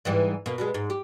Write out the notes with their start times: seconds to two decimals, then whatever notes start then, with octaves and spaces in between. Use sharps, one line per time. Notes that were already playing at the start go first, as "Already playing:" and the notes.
0.05 G#2 E3 G3
0.46 B2 A#3
0.58 B2 G3 G#3
0.74 G#2
0.90 G4